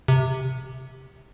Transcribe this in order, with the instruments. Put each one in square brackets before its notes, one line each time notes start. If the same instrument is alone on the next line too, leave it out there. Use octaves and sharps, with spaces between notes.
[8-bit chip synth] C3